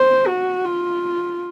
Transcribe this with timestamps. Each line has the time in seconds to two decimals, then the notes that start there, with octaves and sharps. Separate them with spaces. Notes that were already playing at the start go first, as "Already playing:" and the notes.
Already playing: C5
0.27 F#4
0.64 F4